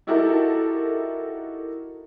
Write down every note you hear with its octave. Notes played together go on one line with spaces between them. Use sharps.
D#4 E4 F#4 G4 A4 A#4